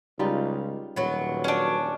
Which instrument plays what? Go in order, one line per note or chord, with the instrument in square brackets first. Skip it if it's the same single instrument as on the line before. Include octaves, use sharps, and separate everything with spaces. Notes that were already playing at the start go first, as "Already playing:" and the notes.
[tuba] C#2 [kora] G3 D#4 F4
[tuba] D#1 [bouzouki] F#3 B3
[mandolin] C#4 D4